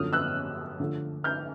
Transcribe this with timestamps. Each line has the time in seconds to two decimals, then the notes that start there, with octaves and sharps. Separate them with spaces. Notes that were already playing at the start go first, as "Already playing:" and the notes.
Already playing: F#2 D3 F3 A3 D#6 F6
0.13 E6 F#6
0.80 D3 F3 A3
1.24 F6 G6